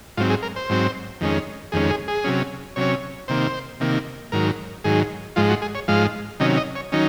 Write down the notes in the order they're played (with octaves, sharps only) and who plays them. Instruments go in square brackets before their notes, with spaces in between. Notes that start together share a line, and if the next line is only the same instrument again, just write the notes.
[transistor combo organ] G#2 F#3 C4 F4
G#4
A#4
C5
G#2 F#3 C4
F2 D#3 G#3 C#4
F2 D#3 G#3 C#4 G#4
G#4
G#4
C3 F#3 C#4
C3 F#3 C#4 C#5
C3 D#3 A#3 C5
C3 D#3 A#3
G#2 D#3 F#3 A#4
G#2 D#3 F#3 G#4
G#2 F3 G#3 F4
F#4
G#4
C#5
G#2 F3 G#3 F5
C3 D#3 F#3 C#4 D#5
D#5
C#5
D#3 F#3 C#4 D#4